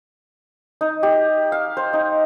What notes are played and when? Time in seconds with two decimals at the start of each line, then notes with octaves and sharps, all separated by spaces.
0.81 D#4
1.03 G4
1.52 F5
1.77 C5
1.93 D#4